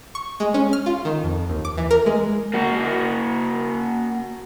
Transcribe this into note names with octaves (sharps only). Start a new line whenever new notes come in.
C#6
G#3
C#4
F6
F4
D#3
F2
D#2
D6
E3
A#4
G#3
A#3 F#4